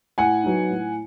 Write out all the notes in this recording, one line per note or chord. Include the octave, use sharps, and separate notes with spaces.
A2 F#5 G#5
F#3 B3 D#4
A2